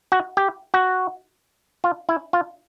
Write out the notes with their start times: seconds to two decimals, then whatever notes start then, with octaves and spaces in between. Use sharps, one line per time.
0.12 F#4
0.37 G4
0.74 F#4
1.84 F4
2.09 E4
2.33 F4